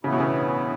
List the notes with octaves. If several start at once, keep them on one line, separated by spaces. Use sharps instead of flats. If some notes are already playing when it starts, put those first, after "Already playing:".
A2 C#3 E3 B3 E4
B2
C#3